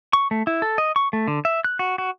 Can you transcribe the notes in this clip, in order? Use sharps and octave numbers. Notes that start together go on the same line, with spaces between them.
C#6
A3
E4
A4
D#5
C#6
A3
D3
E5
F#6
F#4
F#4